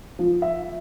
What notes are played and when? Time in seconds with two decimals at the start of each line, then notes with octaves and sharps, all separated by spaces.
0.19 F3
0.42 E5